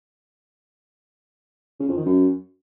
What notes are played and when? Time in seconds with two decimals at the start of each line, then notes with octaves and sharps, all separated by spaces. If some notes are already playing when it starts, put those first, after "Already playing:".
1.80 C#3
1.88 F2
1.97 D#3
2.05 F#2